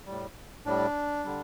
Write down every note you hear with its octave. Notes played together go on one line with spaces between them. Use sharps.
A2 G3
A2 G3 D4
D3 G3